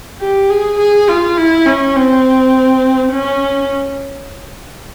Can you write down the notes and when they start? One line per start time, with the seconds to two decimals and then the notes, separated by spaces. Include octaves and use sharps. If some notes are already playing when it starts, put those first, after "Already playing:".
0.20 G4
0.50 G#4
0.79 G#4
1.08 F4
1.37 E4
1.66 C#4
1.95 C4
3.12 C#4